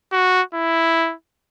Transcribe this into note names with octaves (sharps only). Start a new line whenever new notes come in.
F#4
E4